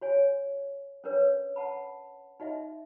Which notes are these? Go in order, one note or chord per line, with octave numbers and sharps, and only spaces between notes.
F#4 C#5 G#5
C#4 D4 A#4 B4 C#5
F#5 A5 B5
D#4 F#4 D#5 E5